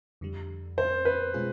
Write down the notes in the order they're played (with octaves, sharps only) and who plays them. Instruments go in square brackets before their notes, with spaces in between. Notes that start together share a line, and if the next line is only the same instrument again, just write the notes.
[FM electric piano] F2 D3 G3
[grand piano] C5
B4
[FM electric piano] B2 G#3 C#4 F4 G#4